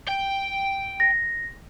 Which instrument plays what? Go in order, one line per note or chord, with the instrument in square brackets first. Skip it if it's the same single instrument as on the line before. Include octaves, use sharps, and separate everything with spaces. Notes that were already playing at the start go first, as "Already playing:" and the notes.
[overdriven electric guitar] G5
[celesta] A#6